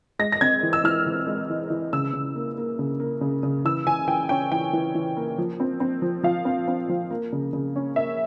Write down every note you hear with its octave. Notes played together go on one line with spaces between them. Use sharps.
G#3 A#6
A#6
C4 G#6
E3
E6
E3 F6
E3
G#3
E3
E3
C#3 E6
C#3
A#3
A#3
C#3
A#3
C#3
C#3
E3 E6
E3 G#5
E3 G5
C#4 G5
E3 G5
E3
E3
A#3
F3
C4
C4
F3
F3 F5
C4
C4
F3
A#3
C#3
C#3
C#4
A#3 E5